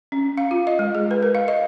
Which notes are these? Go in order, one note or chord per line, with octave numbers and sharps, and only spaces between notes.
C#4
F5
F4
D#5
G#3
G#4
B4
A#4
F5
D#5